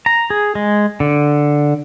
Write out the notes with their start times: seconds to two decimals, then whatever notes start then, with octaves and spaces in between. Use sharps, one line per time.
0.06 A#5
0.30 G#4
0.55 G#3
1.00 D3